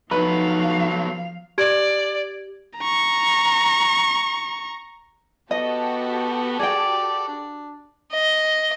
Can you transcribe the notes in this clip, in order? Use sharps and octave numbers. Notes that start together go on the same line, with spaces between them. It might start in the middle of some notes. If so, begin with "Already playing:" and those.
F3 F#3 A3 B3 D#4 B4 F5
G4 D5 G#6 D7
A#5 C#6
B3 F#4 G4 A4 D#5
G#4 D5 G5
D4
D#5